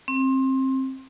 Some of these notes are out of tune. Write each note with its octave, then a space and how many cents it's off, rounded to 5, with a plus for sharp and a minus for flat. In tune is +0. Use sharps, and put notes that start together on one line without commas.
C4 +20